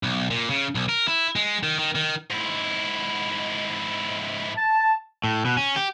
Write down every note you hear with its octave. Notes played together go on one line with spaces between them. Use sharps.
B1
A#2
C#3
B1
A#4
E4
G#3
D#3
D#3
D#3
G#2 E4
A5
A2
B2
C#4
G4